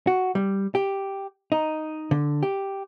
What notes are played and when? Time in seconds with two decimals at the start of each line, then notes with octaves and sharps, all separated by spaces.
0.07 F#4
0.35 G3
0.75 G4
1.52 D#4
2.11 D3
2.43 G4